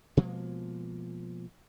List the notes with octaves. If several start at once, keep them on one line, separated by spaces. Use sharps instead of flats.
B2 F3 G#3 A#3